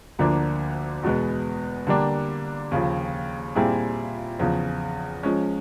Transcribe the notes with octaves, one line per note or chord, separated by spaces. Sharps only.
D2 D3 F3 A#3 D4
E2 B2 G#3 B3
D3 G3 A#3 D4
D#2 C#3 F3
A#2 G3 C4 E4 G#4
E2 C#3 F3
F3 G#3 C#4